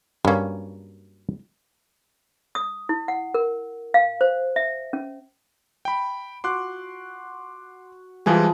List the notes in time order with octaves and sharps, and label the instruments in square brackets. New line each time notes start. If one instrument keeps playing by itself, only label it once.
[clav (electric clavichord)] G2 C#4 [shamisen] F#3 A#3
[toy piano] D#6
E4
F#5
A#4
F5
C5
E5
C#4
[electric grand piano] G5 B5
[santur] F#4 [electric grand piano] C6 D6 F#6
[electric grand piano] E3 G3 G#3 [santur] F3 E4 G#4